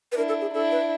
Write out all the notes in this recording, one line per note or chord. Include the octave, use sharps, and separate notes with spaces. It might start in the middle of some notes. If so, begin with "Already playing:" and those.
B4
D4 E4 A#4
A4
G#4
D4 E4 A4
B4